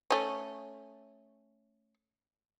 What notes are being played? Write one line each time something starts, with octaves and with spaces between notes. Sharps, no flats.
A3 C#4